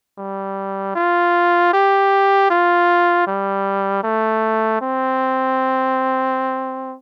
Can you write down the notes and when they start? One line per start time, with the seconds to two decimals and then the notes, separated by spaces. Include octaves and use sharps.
0.18 G3
0.95 F4
1.73 G4
2.50 F4
3.27 G3
4.04 A3
4.81 C4